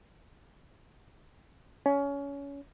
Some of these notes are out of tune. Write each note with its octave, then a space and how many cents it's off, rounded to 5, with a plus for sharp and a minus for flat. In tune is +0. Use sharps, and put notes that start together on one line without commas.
C#4 +25